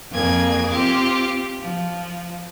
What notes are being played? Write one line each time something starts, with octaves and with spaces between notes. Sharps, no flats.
F2 A#3 G#4 G#6
C4 F4 G4 D6
F3